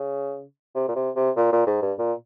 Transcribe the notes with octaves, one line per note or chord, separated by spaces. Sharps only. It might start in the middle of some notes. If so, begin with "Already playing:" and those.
Already playing: C#3
C3
A#2
C3
C3
A#2
A#2
G#2
G2
A#2